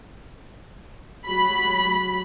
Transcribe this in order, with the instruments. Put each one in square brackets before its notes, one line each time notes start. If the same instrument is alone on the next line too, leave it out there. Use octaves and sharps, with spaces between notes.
[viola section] F#3 B5